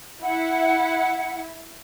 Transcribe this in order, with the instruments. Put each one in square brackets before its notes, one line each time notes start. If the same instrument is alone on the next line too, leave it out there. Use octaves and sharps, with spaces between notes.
[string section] E4 [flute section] F#5